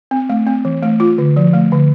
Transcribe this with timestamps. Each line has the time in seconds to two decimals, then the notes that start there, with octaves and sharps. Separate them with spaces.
0.11 C4
0.30 A3
0.47 C4
0.65 E3
0.83 A3
1.00 F4
1.18 D3
1.36 F3
1.53 A3
1.72 D3